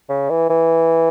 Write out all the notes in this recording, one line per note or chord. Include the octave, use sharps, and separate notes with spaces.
C#3
E3
E3